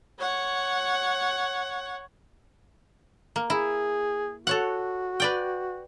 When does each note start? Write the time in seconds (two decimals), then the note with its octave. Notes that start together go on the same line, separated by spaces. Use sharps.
0.19 C#5 F#5
3.36 A#3
3.50 E4 G#4
4.47 F#4 A4 C#5 F#5
5.20 B4 D5 G5